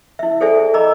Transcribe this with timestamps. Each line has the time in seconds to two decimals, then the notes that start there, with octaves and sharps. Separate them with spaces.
0.19 E4 E5
0.41 G#4 A4 C5 D5 E5 G#5
0.74 A#4 D#5 A#5 B5 D6